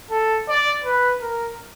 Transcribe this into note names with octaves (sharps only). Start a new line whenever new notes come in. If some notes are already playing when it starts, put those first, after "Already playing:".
A4
D5
B4
A#4